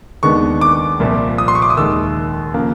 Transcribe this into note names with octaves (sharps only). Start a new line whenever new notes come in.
D#2 D#3 G#3 B3 D4 C#6
D6
C2 A#2 F3
D#6
C6
C#6
D6
D#6
D#2 D#3 G#3 E6
C#3 F3 A#3